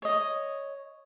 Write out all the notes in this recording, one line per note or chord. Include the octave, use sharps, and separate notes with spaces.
C#5 D#5